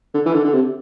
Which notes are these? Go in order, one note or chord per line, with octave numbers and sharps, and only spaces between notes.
D3
E3
D3
D3
C3